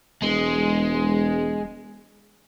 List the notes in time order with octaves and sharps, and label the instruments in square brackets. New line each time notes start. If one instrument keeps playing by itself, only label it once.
[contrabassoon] E1 [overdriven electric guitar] G#3